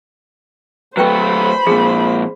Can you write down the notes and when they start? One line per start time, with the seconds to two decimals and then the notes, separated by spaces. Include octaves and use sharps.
0.97 F#3 A3 B4 C5 G5 B5 C#6
1.67 F2 A#2 G#4